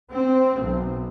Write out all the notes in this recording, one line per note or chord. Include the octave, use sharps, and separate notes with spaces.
C4
B1